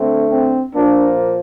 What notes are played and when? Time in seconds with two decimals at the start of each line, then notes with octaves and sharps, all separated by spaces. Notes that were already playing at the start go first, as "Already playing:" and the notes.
Already playing: D3 A3 C4
0.31 C4
0.75 A#2 F3 A#3 D4